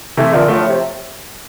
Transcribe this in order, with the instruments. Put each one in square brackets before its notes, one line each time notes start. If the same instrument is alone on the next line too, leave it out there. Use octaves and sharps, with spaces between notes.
[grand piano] C3 E3 [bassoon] A3
[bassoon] A#2 [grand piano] D3 F3
[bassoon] A2 [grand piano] F3 A3
[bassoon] A2
C3